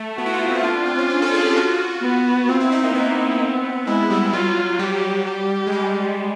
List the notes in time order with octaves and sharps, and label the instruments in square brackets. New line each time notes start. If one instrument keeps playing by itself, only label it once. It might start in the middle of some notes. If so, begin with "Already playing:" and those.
Already playing: [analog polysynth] A3
[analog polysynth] B3 [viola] F#4
[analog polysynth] E4
F4
C4
[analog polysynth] D4 [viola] F4
[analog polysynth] C4
C#4
D4
A4
G#4
G4
F#4
[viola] B3
[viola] C4 [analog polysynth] F4
[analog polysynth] E4
D#4
A#3
[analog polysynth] B3 [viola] C4
[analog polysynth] G#3 [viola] E4
[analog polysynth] G3
[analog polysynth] F#3 [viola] F4
[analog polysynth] G3 [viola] G4
[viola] G4
[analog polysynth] G#3
G3